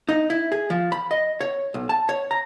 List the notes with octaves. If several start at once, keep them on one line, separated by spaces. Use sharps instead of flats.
D#4
E4
G#4
F3
B5
D#5
C#5
B1
A5
C#5
A#5